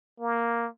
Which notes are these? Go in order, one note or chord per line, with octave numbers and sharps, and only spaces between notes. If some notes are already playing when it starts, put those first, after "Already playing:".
A#3